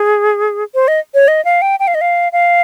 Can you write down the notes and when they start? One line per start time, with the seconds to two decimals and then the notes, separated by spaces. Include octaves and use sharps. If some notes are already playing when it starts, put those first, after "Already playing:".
Already playing: G#4
0.75 C5
0.88 D#5
1.14 C#5
1.28 D#5
1.45 F5
1.62 G5
1.80 G5
1.87 F5
1.95 D#5
2.01 F5
2.32 F5